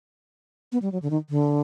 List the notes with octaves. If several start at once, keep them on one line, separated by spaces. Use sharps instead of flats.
B3
G3
F#3
D3
D#3
D3